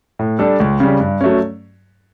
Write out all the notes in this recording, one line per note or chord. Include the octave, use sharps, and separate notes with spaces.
A2
G3 D4 A4
C#2
C#3 G3
G2
F#3 A3 C#4